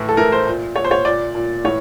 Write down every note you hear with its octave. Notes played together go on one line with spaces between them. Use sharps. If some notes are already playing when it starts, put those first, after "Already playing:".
Already playing: A2 E3
A4
A2 E3 A#4
C5
A#2
A#2 C#5
C5
C#5
A#2 D5
A#2
A2 E3 C#5